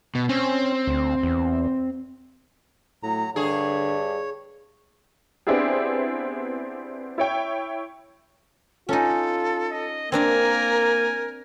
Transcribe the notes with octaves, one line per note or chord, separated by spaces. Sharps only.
B2
C4 C#4
D2
E2
A2 F#3 A#5
G2 D3 G#4 C#5
B3 C4 D4 E4 G4 G#4
E4 C#5 G5
C#4 D#4 F4 A4
D#5
A#3 C4 D4 A#4 D5 G#5